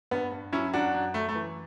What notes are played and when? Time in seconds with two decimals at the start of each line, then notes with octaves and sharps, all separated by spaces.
0.11 G2 B3
0.32 G2
0.53 F#3 C#4 E4
0.73 F#2 D4 F#4
0.94 F#2
1.14 F#2 A3
1.29 A3
1.35 E3